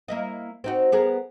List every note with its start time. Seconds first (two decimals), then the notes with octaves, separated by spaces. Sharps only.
0.08 A#3 E4 D#5
0.64 C4 D#4 F#4
0.92 B3 G#4 A#4